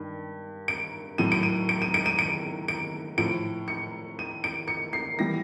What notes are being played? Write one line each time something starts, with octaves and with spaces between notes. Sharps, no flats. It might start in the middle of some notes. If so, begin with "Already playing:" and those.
Already playing: G2 D#3
D7
A2 F#3 D#7
D7
D#7
D7
D#7
D7
D#7
D7
D7
A2 F3 D7
C#7
D#7
D7
C#7
C7
E3 G3 A#6